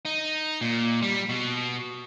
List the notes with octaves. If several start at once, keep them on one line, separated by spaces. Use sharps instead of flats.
D#4
A#2
G3
B2